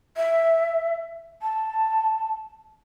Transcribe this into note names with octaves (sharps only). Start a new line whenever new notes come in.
E5
A5